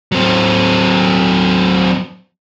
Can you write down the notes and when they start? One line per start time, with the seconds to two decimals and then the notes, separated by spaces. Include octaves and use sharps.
0.12 F#3 C4